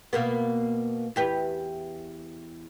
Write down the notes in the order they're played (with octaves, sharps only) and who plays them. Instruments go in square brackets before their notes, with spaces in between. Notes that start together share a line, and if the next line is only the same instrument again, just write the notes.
[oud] B2 A#3 B3
E2 G4 B4